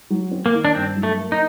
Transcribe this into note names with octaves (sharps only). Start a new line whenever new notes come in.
F#3
C4
A#3
D#3
D4
G2 C4
F#3
A3
A#3
D#4